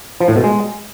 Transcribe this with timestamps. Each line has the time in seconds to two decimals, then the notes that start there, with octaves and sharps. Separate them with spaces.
0.20 F3
0.28 A2
0.36 B2
0.44 G#3